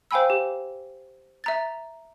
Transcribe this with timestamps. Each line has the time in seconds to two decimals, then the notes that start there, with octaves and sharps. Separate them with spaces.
0.11 C5 F5 G5 G#5 B5 E6
0.30 G4
1.44 E5 A#5 A6